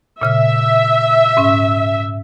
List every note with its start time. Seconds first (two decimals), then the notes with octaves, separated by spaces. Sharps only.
0.22 A#2 C#3 E5 F6
1.37 G#2 C#4